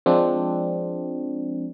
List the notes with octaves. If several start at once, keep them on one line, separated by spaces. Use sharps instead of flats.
F3 G#3 C4 D4